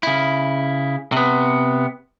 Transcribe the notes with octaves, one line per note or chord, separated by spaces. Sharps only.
C#3 E4
C3 B3